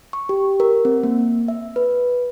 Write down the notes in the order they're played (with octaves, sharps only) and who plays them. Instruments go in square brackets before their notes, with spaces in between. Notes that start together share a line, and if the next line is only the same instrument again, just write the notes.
[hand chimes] C#6
G4
A#4
C4
A#3
E5
B4